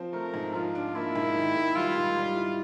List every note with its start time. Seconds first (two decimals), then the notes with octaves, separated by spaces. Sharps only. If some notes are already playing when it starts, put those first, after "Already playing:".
Already playing: F3 C4
0.13 A3 A#4
0.34 G#2
0.54 F3 F4
0.75 D4
0.95 A#3 E4
1.16 G#2
1.36 D#3
1.56 G#2
1.76 G3 F4
1.96 G#2
2.16 G3
2.36 E4